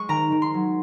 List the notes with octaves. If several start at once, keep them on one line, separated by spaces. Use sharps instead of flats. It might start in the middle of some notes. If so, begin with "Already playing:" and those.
Already playing: G#3 C#6
D#3 A#5
D#3
C6
F#3